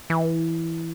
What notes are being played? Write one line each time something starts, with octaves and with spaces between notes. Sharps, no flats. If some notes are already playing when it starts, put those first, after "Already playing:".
E3